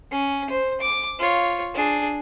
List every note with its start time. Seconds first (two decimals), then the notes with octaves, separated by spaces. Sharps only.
0.11 C#4
0.50 C5
0.81 D6
1.19 F4 C#5
1.74 D4 G#4